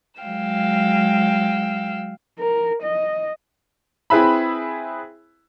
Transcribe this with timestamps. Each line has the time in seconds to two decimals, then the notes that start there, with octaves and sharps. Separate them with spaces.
0.21 F#3 G#3 F5 G5 E6
2.39 A#4
2.83 D#5
4.10 C4 E4 G#4 B4 E5 B5